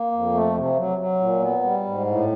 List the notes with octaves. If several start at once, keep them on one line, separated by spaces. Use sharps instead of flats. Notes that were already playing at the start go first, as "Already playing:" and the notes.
Already playing: A#3
F2
A3
C3
F#3
F#3
A#2
B3
G3
G#2
A2